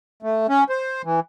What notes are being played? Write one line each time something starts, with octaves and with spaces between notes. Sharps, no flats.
A3
C#4
C5
E3